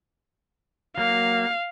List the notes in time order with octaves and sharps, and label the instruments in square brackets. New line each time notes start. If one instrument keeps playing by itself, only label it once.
[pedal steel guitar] F#3 A#3 [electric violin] F5